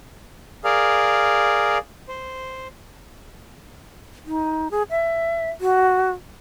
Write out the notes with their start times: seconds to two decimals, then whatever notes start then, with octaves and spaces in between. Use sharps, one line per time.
0.64 G#4 A#4 D5 F5
2.08 C5
4.26 D#4
4.71 G#4
4.90 E5
5.61 F#4